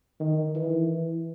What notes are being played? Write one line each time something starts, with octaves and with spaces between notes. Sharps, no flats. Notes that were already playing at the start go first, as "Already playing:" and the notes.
D#3
E3
E3